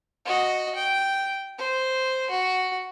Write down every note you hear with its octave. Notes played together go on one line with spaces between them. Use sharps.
F#4 D#5
G5
C5
F#4